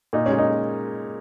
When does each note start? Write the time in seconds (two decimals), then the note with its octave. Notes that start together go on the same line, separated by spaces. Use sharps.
0.13 A#2 D#4
0.26 G#3 C#4
0.38 D#4